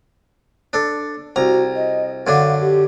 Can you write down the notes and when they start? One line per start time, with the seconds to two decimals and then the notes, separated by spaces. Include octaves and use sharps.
0.73 D4 A4
1.36 C2 F#4 A#5
1.76 D#5
2.27 F#2 D3 D4 F5
2.61 G4